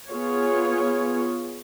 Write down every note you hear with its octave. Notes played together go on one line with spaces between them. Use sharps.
B3 F4 G#4 C#5